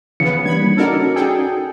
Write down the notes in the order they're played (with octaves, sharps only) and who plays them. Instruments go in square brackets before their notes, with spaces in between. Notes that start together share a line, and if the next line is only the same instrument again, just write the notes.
[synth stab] C#3 B3 [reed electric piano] E3 [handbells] C#7
[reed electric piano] G3 A#3 D4 [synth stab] B5 G#6
[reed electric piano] C#4 D#4 F#4 [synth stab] A4 A#4 D5
[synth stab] G#4 A4 G5